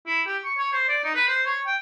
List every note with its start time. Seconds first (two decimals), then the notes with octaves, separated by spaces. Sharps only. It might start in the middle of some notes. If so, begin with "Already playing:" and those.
0.07 E4
0.26 G4
0.44 C#6
0.58 C#5
0.73 C5
0.88 D5
1.04 D#4
1.15 B4
1.28 C5
1.46 C#5
1.67 G5